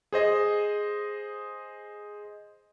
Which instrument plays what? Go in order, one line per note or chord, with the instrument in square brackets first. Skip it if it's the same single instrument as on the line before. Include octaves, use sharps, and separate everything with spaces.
[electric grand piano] G#4 C5 D#5